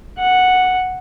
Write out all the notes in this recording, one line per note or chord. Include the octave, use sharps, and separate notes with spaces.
F#5